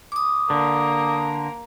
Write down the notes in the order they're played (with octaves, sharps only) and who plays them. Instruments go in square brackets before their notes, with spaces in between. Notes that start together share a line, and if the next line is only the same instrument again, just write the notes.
[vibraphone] D6 D#6
[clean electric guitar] D3 [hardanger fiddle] A#3